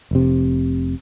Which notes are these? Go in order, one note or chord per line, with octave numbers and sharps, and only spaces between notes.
F1 C3